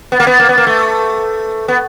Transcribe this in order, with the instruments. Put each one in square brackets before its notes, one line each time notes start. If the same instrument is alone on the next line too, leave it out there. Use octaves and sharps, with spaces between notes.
[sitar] B3
A#3
B3
A#3
B3
A#3
A3
B3